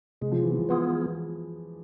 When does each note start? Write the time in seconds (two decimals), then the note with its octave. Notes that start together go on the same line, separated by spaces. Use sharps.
0.21 C3 G#3
0.32 F3
0.42 E3
0.52 F3
0.69 E3 B3 F4 G#4